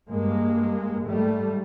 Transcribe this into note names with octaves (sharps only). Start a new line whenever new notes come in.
G2 G#3 A#3
G#2 G3 A3